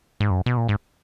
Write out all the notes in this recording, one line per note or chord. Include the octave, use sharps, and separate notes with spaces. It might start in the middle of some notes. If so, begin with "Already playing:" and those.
G#2
F#2
B2
A#2
G#2